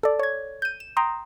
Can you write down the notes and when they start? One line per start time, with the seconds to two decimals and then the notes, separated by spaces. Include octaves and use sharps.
0.03 A4 D5
0.19 C#5 G#6
0.62 G6 D#7
0.80 E7
0.97 G5 A#5 C6 D#6